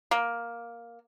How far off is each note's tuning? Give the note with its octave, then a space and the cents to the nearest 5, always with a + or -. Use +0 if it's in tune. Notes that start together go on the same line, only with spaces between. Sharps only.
A#3 +5